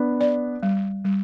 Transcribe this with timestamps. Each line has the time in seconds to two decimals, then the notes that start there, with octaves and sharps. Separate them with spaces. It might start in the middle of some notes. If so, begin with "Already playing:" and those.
Already playing: B3 D4
0.21 D5
0.63 G3
1.05 G3